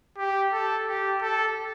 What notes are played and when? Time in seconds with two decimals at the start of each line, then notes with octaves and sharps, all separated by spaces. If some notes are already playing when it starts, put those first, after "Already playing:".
0.18 G4
0.52 A4
0.87 G4
1.22 A4